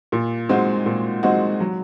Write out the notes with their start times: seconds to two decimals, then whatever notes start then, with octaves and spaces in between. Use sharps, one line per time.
0.12 A#2
0.49 G#3 C4 D#4 F#4
0.86 A#2
1.23 G#3 C4 D#4 F#4
1.60 F#3